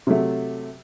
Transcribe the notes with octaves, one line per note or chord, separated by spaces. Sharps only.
C3 F#3 A3